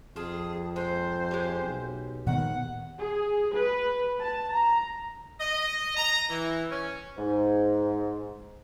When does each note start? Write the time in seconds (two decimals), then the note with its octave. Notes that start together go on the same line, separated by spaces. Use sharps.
0.16 F2 F4 G#4 A5
0.76 G#3 C5
1.31 G#3 C#4 G4
1.64 B1
2.27 D#2 A#2 D#3 B3 F#5
2.99 G#4
3.54 B4
4.20 A5
4.52 A#5
5.40 D#5
5.97 A#5
6.30 E3
6.71 C#4
7.18 G#2